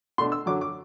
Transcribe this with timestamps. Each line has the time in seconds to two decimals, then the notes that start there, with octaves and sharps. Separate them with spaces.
0.18 B2 A3 D4 C6
0.32 E6
0.46 F#2 D3 F#3 D6
0.61 D6